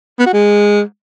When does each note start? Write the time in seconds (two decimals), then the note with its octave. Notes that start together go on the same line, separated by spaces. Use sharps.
0.19 B3
0.26 F#4
0.33 G#3